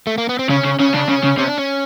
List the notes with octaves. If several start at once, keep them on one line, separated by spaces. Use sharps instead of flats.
A3
A#3
B3
C4
C#3 C#4
C#3
C#3 C#4
C#3 D4
C#3 C#4
C#3
C3 C#4
D4
C#4